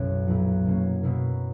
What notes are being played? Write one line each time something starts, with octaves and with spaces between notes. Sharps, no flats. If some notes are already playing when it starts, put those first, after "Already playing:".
Already playing: B1 F#2 B2 F#3 C#4 E4 F#4
B1 A#2 F#3 B3 E4
B2 F#3 A#3 C#4
B2 A#3 E4 A#4